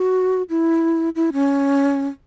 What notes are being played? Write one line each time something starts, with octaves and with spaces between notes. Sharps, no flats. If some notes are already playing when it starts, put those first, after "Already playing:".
Already playing: F#4
E4
E4
C#4